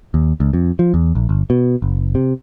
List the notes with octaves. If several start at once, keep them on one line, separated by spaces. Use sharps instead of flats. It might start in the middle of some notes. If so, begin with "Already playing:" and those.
D#2
C#2
F2
F3
E2
A#1
G1
B2
F#1
C3